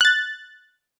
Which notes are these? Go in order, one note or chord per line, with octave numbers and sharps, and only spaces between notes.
F#6 A6